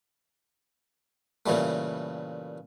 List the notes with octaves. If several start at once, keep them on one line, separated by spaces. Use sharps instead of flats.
A#2 C#3 E3 G3 A3